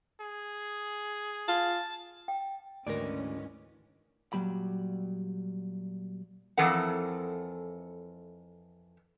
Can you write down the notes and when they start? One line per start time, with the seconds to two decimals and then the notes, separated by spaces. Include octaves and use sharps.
0.21 G#4
1.48 F4 A5
2.28 G5
2.87 D2 G#2 D#3 E3 C#4 A#4 D5
4.33 A#2 F#3 G3 B5
6.57 F2 E3 A4 A#4 F#5